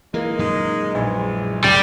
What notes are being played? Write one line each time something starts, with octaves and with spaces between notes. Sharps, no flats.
E3 G#3 A#3 D#4
F#2 A#2 D#3 G#3 D#4
A#1 E3 G#3
F#1 A#2 G3 C#4 D6